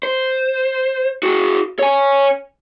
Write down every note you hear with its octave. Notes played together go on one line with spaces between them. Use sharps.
C5
F#4 G#4
C#5 G#5